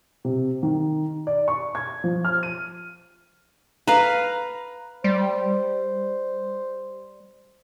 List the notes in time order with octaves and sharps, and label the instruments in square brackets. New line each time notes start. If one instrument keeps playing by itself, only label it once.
[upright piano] C3
D#3
D5
C#6
G#6
F3
F6
D#7
[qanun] B4 F5 [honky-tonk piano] A#5
[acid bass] G3 [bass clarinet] C5